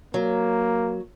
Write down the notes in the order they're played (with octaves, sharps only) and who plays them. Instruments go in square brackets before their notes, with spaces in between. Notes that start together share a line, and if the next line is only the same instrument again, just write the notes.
[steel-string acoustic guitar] F#3 [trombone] A#3